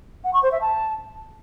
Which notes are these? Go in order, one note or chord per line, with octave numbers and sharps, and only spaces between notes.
F#5
C#6
C5
E5
A5